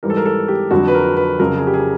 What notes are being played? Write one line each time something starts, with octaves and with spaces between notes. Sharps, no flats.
G#2 E3 G3 A#4
A4
A#4
A4
G4
F2 D3 F#3 F#4
B4
A#4
B4
F2 C#3 F#3 A#4
G#4
G4
G#4